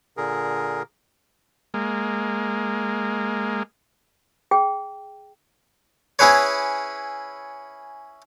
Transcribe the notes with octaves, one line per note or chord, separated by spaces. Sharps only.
A#2 D3 G#4 A#4
G#3 A#3
G#4 G5
C#4 E4 G#4 B4 C#5